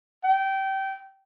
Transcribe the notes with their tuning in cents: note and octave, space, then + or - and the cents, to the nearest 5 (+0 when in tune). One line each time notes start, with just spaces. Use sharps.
G5 -20